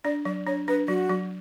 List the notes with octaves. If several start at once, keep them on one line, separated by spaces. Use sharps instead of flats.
D4 D5
F#3 D5
D4 C#5
D4 B4
F#3 F#4
F#3